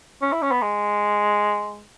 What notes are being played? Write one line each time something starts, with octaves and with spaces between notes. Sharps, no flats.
C#4
E4
C#4
B3
G#3